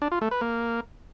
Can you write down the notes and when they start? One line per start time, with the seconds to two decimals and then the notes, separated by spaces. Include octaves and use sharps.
0.02 D4
0.12 F4
0.21 A3
0.31 B4
0.41 A#3